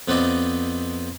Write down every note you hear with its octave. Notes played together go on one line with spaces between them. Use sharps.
F2 B3 C4 D5 D#5